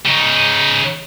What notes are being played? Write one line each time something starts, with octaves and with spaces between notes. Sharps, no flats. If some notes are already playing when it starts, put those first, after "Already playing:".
C#3 D#4